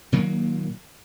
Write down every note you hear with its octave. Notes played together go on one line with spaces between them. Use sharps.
A#2 D#3 F#3 A#3